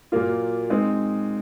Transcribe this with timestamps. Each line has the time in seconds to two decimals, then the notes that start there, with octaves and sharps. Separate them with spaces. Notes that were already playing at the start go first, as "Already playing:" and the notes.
0.12 A#2 F#3 A#3 F4
0.70 G#3 C4 D#4